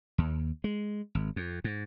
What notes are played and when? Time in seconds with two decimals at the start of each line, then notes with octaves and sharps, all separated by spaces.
0.18 D#2
0.64 G#3
1.15 G#1
1.36 F2
1.64 G#2